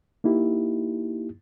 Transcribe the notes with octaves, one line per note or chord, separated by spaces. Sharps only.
A#3 D#4 E4 G4